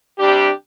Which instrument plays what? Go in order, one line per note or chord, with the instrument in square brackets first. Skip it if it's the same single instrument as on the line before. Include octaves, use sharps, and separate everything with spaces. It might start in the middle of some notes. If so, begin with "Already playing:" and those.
[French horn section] C3 G3 D4 G4